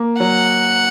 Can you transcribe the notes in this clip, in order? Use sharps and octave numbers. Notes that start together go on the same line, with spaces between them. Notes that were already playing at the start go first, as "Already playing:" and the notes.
Already playing: A#3
F#3 F#5